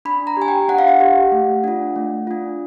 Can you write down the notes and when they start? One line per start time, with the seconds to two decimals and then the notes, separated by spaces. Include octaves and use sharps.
0.05 D4 B5
0.27 A#5
0.37 G4 G#5
0.48 G5
0.69 D4 F#5
0.79 F5
0.88 F#5
1.00 G4
1.32 A3
1.64 D4 F4
1.96 A3
2.27 D4 F4